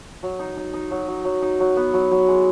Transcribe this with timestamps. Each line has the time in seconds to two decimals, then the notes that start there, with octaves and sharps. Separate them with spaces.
0.23 F#3
0.39 D#4
0.57 D#4
0.73 D#4
0.91 F#3
1.08 F#3
1.25 F#3
1.42 D#4
1.60 F#3
1.76 B3
1.93 F#3
2.11 F#3
2.28 G#3